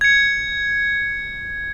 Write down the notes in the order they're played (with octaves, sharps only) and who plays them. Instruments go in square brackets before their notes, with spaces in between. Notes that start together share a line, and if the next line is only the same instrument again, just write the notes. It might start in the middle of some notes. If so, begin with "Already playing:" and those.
[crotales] G#6 C#7